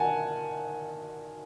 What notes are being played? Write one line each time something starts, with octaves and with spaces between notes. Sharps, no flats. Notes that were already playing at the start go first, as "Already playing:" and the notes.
Already playing: D#3 F#5 G#5 A5